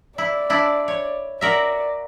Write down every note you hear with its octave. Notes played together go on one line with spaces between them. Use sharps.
E4 D5
D4 E4
C#5
F#4 A#4 D5 E5